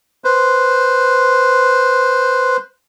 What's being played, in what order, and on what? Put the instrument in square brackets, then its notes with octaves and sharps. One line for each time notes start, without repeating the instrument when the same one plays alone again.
[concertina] B4 C5